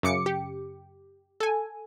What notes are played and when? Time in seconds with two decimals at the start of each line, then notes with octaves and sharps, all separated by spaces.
0.03 F#2 C#3 D6 C#7
0.26 G4
1.40 A4 G#5